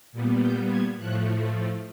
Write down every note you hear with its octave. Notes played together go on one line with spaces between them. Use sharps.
A#2 G3 B3
G6
G#6
A2 F3 A3 F#6